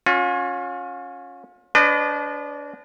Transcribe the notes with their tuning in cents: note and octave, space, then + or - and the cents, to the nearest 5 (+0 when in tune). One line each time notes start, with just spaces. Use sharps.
C#4 +0 F4 +40
D4 -30 B4 +35 D#5 -45